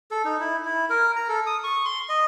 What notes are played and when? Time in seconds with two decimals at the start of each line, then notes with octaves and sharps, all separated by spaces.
0.11 A4
0.25 D#4
0.40 E4
0.65 E4
0.90 A#4
1.16 A#5
1.29 A4
1.46 D#6
1.64 C#6
1.85 C6
2.09 D#5